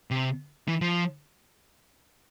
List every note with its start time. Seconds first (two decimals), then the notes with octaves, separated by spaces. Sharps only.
0.11 C3
0.68 E3
0.81 F3